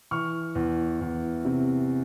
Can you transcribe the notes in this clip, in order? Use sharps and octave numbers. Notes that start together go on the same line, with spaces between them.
E3 C#6 F6
E2
E2
C3